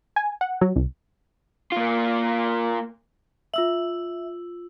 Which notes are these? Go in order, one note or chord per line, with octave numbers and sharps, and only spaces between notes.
G#5
F#5
F#3
C2
A#3 F4
F4 E5 E6 F#7